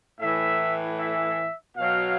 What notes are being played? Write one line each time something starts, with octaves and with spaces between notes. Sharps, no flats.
A2 E3 E5
E5
B2 F#3 F5